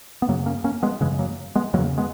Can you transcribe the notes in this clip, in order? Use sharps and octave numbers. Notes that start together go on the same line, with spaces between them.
B3
F#2 C#3 F#3 A#3
A#3 C#4
A#3 C#4
G#3 B3
F#2 C#3 E3 G#3
F#3 A#3
G#3 B3
E2 C#3 F#3 A#3
G#3 B3